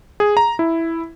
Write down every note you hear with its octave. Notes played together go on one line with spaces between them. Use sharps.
G#4
A#5
E4